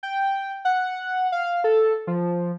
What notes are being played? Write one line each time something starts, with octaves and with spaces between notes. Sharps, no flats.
G5
F#5
F5
A4
F3